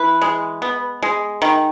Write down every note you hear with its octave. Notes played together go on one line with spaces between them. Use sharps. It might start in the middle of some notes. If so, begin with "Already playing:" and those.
Already playing: E3 B4
G#3
B3
G#3
D#3